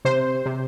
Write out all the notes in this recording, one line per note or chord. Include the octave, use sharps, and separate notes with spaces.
C3 C5
C3